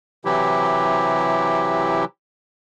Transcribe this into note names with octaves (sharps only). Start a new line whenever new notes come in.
C3 E3 F#3 E4 G4